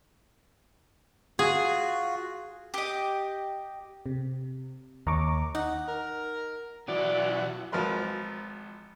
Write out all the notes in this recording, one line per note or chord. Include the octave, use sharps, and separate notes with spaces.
F4 F#4 G#4
G4 D#5
C3
D#2 A#5 C#6 D6
D#4 F#5
A#4
B1 E3 F#4 D5
G#1 F3 F#3 A#4 B4 C6